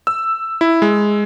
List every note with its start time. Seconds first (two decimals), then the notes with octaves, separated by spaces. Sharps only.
0.07 E6
0.61 E4
0.82 G#3